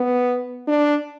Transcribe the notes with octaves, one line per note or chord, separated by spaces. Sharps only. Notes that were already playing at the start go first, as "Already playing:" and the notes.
Already playing: B3
D4